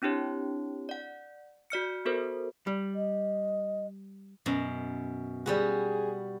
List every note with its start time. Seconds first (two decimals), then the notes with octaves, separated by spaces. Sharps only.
0.02 C4 D4 E4 G4 C#5
0.89 D5 F#5
1.70 F#4 D5 F6 C#7
2.05 B3 F#4 A4 A#4 C5
2.67 G3
2.95 D#5
4.46 F#2 B2
5.46 G3 B3 F#4 G#4